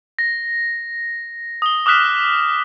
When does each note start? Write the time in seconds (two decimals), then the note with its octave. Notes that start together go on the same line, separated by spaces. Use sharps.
0.19 A#6
1.62 D#6 G7
1.86 D6 D#6 F6 F#6 B6 E7